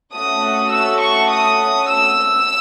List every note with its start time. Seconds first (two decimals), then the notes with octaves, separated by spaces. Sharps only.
0.14 A3 C#4 F#4 A4 D#6
0.72 E6
1.01 C#6
1.30 D#6
1.89 E6